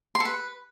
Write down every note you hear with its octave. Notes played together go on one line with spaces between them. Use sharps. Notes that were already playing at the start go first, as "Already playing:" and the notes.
C6
A4
B4